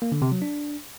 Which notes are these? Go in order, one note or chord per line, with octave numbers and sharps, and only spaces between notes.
A#3
D3
C3
F#3
D4